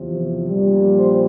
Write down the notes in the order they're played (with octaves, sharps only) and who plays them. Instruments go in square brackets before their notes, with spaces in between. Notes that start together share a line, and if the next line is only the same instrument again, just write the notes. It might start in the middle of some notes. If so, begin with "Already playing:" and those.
Already playing: [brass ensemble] E2 C3 F3
A#1 A#2 G3
C5